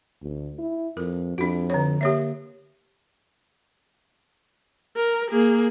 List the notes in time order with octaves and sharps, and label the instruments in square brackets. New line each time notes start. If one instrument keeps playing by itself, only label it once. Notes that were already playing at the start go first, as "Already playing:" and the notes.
[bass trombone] D2
E4
[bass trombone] F2 [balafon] A#4
[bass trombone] F2 [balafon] D4 F#4
[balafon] D3 C#5
[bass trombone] A#3 [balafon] G4 C#5 E5
[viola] A#4
A#3 G#4